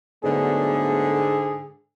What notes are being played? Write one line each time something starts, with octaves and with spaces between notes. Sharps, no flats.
G#2 D3 F#3 A3 B3 G#4